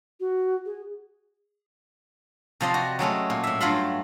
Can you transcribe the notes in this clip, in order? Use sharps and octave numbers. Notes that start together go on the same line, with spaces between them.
F#4
G#4
C3 F3 D5 D#5 C6
F#4
F#3 G#3 A3 C#4
A#2
A2 E5
G2 F#3 A3 F4 B5 C6